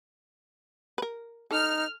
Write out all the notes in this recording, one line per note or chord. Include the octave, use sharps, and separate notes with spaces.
A#4 B4
D#4 A4 F6